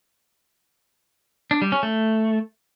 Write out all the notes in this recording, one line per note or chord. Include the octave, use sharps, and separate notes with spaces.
D4
G3
C#4
A3